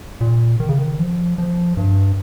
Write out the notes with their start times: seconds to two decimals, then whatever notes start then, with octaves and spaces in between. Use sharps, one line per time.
0.21 A#2
0.60 D#3
0.69 C#3
0.78 D#3
0.99 F3
1.38 F3
1.77 G2